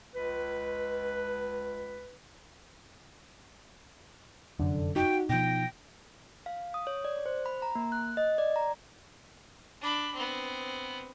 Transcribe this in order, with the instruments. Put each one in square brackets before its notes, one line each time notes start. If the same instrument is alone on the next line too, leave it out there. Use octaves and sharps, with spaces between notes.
[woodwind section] C#2 B4
[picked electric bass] F1 F#2 [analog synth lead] D3
[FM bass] D#4 [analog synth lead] F#4 [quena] G5
[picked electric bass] B2 F3 [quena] G5 [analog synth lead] A#6
[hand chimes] F5
D#6
C#5
D5
C5
B5
A#5
A#3
F#6
D#5
D5
A#5
[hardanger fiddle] D4 B5
B3 C4